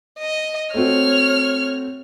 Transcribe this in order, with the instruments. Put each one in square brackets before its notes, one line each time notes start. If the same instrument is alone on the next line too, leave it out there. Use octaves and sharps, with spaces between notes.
[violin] D#5
[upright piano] A3 C4 F#4 [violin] C#5 F6